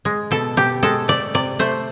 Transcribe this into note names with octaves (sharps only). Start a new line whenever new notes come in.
G#3
B2 A4
B2 G4
G#3 A4
A3 D5
C3 D5
A3 C5